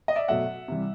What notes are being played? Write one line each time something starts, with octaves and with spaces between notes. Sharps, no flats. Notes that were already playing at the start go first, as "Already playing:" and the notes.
D#5
D5 E5
B2 F#3 A3 E5 F#5
C3 E3 G3